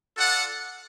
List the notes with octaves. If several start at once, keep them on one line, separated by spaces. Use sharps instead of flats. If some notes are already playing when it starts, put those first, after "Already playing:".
F4 A4 D5 F#5